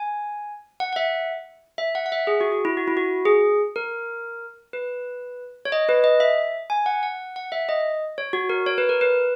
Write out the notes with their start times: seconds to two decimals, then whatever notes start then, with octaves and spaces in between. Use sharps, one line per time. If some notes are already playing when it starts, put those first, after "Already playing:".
Already playing: G#5
0.80 F#5
0.93 F#5
0.96 E5
1.78 E5
1.95 F#5
2.06 F#5
2.12 E5
2.27 G#4
2.41 F#4
2.52 F#4
2.65 E4
2.77 F#4
2.87 E4
2.97 F#4
3.25 G#4
3.76 A#4
4.73 B4
5.65 C#5
5.72 D#5
5.89 B4
6.04 D#5
6.20 E5
6.70 G#5
6.86 F#5
7.03 F#5
7.36 F#5
7.52 E5
7.69 D#5
8.18 C#5
8.33 F#4
8.49 A#4
8.66 C#5
8.78 B4
8.89 A#4
9.01 B4